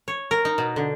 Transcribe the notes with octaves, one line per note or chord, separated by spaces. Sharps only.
C#5
A#4
D#4
B2
D3